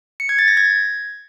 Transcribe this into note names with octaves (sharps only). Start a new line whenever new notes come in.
C#7
G#6
A6
A#6
G#6